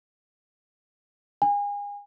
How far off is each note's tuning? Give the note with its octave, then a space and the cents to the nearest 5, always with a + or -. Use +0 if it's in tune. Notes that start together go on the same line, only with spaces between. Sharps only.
G#5 -35